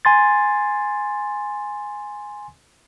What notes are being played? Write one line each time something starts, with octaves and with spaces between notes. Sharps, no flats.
G#5 C6 A6